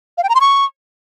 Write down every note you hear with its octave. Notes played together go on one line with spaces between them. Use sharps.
F5
G5
A#5
C6
C#6